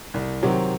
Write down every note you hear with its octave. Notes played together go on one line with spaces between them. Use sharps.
C2
C3 D#3 F#3 C4